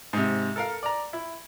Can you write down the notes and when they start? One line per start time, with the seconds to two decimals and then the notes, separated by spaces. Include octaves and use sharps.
0.13 G#2 C3
0.56 A4 A#4 F5
0.83 D5 A#5
1.13 E4